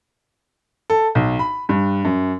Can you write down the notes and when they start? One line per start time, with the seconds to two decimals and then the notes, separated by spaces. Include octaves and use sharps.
0.90 A4
1.15 B1
1.39 B5
1.69 G2
2.05 F#2